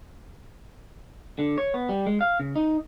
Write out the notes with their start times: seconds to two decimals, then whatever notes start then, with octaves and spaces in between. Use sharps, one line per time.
1.39 D3
1.58 C#5
1.74 B3
1.89 G3
2.07 G#3
2.21 F5
2.40 C#3
2.56 D#4